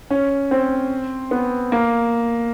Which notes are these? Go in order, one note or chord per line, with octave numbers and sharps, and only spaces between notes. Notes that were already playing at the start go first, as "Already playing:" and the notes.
C#4
C4
B3
A#3